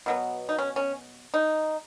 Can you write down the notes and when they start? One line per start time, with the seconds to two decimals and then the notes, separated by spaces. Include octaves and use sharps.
0.06 B2 F#3 B3
0.49 D#4
0.58 C#4
0.76 C#4
1.34 D#4